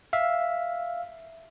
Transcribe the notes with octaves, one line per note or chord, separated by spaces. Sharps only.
E5 F5